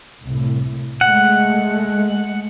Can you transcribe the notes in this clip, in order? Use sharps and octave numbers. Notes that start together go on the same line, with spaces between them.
C2 A2
G#3 A3 F#5